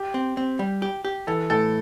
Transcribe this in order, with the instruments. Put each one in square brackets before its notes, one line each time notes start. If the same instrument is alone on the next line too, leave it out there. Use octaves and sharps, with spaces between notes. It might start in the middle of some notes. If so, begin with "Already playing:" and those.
Already playing: [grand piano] G4
[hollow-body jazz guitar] C4
C4
G3
G4
G4
[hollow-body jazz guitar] E3 [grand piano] A4
[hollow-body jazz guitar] A2 [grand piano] A4